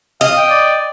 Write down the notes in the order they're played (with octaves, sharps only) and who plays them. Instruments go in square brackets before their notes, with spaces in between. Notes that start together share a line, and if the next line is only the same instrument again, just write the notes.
[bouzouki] D#5 [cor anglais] F5
[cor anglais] G5
[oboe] D5